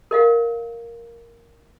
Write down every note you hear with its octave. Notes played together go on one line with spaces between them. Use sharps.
A#4 D#5 F5 F#5